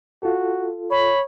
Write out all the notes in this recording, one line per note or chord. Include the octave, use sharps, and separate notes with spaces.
F4 F#4 A4
C#5 B5